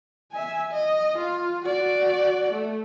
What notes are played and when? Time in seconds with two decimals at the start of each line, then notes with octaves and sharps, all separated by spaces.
0.32 E5 G#5
0.71 D#5
1.18 F4
1.65 F#4 D5
2.52 A3